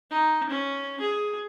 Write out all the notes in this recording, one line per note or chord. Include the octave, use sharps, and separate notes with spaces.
D#4
C#4
G#4